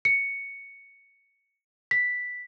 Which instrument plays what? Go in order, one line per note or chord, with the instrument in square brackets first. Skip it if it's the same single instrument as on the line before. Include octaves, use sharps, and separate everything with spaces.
[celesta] C#7
B6